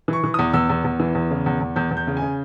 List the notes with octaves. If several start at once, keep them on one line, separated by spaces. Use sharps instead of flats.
E3 C#6
E3
E2 D#6
E2 E6
E2
E2
E3
E2
C#3
E2
E2
E2 G6
E2
G6
C#3
G#5
C#3